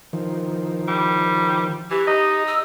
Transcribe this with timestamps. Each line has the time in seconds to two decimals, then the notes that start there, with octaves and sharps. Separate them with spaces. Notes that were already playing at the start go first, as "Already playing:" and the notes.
0.13 D#3 F3
0.88 G3
1.91 E3 G4
2.07 D#4 D#5
2.47 E6